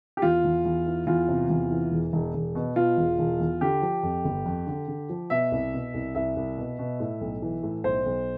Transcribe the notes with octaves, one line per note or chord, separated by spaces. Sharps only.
G4
E2 F4
E2
E2
E3
E2 F4
C3
E2
E3
E1
E1
E1
B2
B2 F4
E1
E1
E2
D3 G4
F3
F2
G1
F2
D3
D3
F3
B2 E5
C2
B2
C2
C2 E5
C2
B2
B2
A2
B1
E3
A2
B1 C5
B1